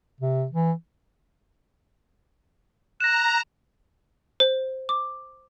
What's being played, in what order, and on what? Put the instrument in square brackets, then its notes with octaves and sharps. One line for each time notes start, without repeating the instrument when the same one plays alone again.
[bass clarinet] C3
E3
[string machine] A#5 [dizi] F#6 [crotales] A#6 E7
[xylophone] C5
D6